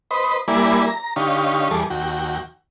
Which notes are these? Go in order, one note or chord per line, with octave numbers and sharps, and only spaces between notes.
B4 C5 D#5 B5
G3 A#3 E4 D5 G#5 B5
A#5
D3 D#4 G4 C#5 F5
E2 G3 G#4 A4 D6
D#2 F#4 G5